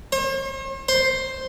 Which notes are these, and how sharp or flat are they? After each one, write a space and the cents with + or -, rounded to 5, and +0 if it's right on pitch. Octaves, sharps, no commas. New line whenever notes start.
C5 +45
C5 +5